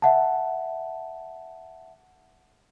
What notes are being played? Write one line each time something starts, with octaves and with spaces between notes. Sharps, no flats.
E5 F#5 A5